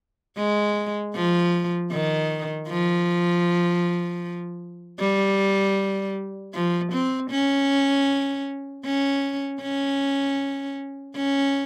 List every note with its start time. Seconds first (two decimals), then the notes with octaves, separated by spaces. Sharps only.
0.37 G#3
1.15 F3
1.92 D#3
2.69 F3
5.00 G3
6.54 F3
6.92 C4
7.31 C#4
8.85 C#4
9.62 C#4
11.16 C#4